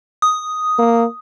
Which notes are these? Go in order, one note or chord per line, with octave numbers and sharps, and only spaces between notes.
D#6
A#3